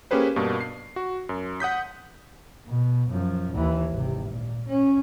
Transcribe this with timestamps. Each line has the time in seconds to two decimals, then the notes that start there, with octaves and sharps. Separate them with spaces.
0.11 A#3 C#4 G4 G#4 B4 C5
0.36 G2 B2 A#3
0.61 C7
0.96 F#4
1.29 F#2
1.60 F#5 D#6 G6 B6
2.67 B2
3.08 F#2 F3
3.55 D#2 E3
3.92 G#1 C3
4.26 A#2
4.67 C#4